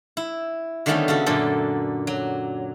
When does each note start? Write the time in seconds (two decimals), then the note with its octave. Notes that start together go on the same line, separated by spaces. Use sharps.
0.17 E4
0.86 D3 D#3 G3 A3 B3 C#4
1.08 C#3 F#4 A4
1.26 F#2 A#2 D3 A4
2.07 F#3